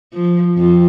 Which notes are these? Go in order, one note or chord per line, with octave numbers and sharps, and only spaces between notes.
F3
F2 F4